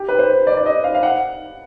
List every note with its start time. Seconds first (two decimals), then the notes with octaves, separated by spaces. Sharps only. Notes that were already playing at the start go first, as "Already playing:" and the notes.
Already playing: G4
0.08 B4
0.19 C5
0.47 D5
0.57 D5
0.66 D#5
0.84 F5
0.95 F5
1.03 F#5